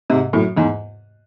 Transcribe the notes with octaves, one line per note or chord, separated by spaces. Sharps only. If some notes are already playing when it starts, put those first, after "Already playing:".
G#2 C3
F#2 A2
E2 G#2